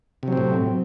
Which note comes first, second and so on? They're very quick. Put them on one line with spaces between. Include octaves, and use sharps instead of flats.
C3 F#3 C4 A2